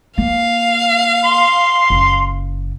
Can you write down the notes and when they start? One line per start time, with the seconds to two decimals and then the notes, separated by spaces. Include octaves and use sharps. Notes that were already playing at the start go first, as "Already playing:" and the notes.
0.18 A#3 F5
1.25 C6
1.90 F#1